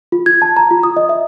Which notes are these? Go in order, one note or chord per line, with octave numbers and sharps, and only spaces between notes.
F4
G#6
A5
A#5
F4
D#6
D#5
E5